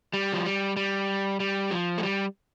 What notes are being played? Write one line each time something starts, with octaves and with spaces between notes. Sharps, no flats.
G3
F3
G3
G3
G3
F3
A3
G3